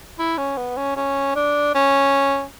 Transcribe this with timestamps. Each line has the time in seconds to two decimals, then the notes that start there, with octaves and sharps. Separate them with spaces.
0.19 E4
0.38 C#4
0.57 B3
0.77 C#4
0.97 C#4
1.36 D4
1.75 C#4